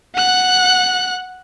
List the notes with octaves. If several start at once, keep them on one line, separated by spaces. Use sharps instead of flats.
F#5 F#6